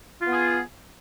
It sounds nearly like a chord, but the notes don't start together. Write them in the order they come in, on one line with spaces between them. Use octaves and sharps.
F4 B3 G#4